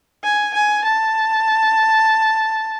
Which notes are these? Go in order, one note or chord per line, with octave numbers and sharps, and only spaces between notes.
G#5
G#5
A5